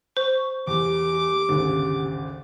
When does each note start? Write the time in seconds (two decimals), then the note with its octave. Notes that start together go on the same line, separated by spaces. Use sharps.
0.17 C5 C#6
0.67 E2 G4 D6
1.49 G#1 D2 C#3